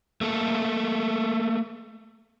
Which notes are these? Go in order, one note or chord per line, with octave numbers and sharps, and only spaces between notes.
A3 A#3 A4